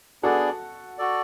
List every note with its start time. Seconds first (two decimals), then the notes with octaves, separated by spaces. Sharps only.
0.23 B3 D4 F#4 G#4 A4 D5
0.98 F#4 A4 D5